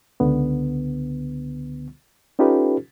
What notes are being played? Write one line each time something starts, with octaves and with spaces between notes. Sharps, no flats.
C#2 D3 B3
C#4 D#4 F4 G4 A4 B4